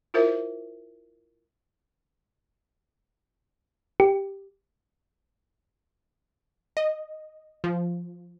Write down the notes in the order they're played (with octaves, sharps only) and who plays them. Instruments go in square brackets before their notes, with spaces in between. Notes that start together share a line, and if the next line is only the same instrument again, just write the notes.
[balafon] E4 F4 A#4 C5 E5
[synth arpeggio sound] G4
[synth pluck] D#5
F3